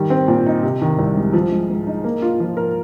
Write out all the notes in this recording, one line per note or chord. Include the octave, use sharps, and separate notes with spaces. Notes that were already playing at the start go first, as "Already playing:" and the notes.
Already playing: D#3 G3
C4
A#2
D#4
C3
D#3
C2
G#3
F3
G#3
G#2
D#4
A#3
F4
F3
A#4